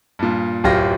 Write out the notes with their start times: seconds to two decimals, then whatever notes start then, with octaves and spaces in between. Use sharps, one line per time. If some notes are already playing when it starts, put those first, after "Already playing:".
0.19 G2 A#2
0.64 D1 F#2 F4 G4 A#6